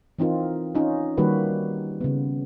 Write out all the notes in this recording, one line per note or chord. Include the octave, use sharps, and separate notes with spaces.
E3 C4 D#4 F4 A#4
C#4 D#4 F4
D#3 G3 A#3 F#4 G4 B4
C#3 B3